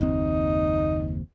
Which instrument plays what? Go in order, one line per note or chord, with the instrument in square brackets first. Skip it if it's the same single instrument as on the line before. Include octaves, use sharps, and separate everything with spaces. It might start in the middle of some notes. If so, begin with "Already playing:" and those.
[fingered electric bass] F#1 D#2 C4 [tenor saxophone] D#4